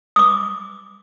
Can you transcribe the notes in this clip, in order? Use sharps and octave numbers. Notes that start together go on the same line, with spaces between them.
D6 D#6